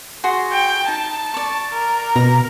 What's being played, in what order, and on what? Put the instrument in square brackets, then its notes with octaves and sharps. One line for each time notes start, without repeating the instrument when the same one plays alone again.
[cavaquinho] F#4 G#4 C6
[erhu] G5
[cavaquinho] D#4 [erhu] A5
[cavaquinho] D5 C#6
[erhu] A#4
[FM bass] B2 [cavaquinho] A#5